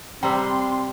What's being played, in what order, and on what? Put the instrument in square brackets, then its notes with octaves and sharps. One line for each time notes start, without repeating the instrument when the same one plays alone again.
[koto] C3 G3 [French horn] C4 [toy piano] G5 A#5 E6 [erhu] C6